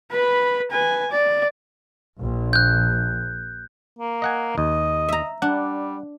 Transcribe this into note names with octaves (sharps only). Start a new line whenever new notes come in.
B4 B5
B4 G#5
D5
A#1
F#6 G6
A#3
D#5 F#5 G#5
D#2 D#5
E5 A#5
G3 D4 F#5